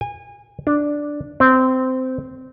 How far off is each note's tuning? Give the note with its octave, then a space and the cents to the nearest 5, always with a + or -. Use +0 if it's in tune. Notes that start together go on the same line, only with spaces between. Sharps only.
G#5 -30
D4 +0
C4 -15